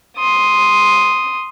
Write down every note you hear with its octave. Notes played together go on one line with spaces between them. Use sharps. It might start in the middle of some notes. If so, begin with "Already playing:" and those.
C6 D#6